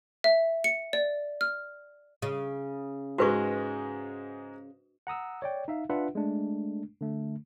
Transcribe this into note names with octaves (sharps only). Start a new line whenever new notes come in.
E5
C#7
D5
F6
C#3
G#2 G#3 F#4 B4 C#6
F#5 A#5 D#6 E6
C#5 D5 G5
D#4 E5 F5
D4 F4 B4 E5 F#5
G#3 A3 D4
D3 A3